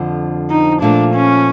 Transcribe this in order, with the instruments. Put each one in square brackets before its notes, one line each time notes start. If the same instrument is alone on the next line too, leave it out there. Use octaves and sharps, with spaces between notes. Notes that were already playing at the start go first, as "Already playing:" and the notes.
Already playing: [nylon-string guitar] F2 D3 F3
[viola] D#4
[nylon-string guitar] A#2 F3 A3 [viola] D4
[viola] C#4